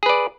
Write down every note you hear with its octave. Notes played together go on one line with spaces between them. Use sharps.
G#4 B4 D5